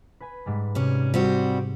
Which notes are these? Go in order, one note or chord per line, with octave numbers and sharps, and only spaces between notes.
B4 G#5 B5
G#2 G3 G#3
C3 G3 C#4
G3 C4 F#4